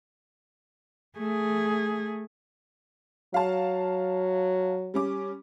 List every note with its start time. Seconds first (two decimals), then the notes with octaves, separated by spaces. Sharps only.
1.18 A3 G#4
3.34 F#3 F5 A5
4.94 G3 C#4 D6